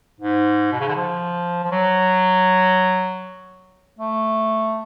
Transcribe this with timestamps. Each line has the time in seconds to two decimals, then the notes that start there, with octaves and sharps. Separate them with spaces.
0.20 G#2
0.73 B2
0.80 C#3
0.88 D3
0.95 F3
1.64 F3
1.71 F#3
3.99 A3